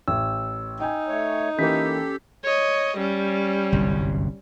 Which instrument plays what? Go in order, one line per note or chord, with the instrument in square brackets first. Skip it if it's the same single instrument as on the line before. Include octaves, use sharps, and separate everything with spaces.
[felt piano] A1 [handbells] E6
[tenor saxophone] D#4 [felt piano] G5 G#5
[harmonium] A3 C#5
[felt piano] E3 A#3 [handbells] C#4 G6 B6 [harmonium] G4 A4
[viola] C#5 D#5
G3 C#4
[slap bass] G1 C2 F#2